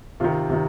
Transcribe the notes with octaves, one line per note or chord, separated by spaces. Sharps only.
C3 D#3 F4
C3 D#3